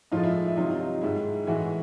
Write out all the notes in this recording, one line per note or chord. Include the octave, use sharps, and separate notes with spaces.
A2 F3 G#3 D#4 F4
E4
E4
C3 D#3 F#3 D#4 F4
D#4 F4
G#2 D#3 G#3 E4
A2 E3 G#3 E4 F#4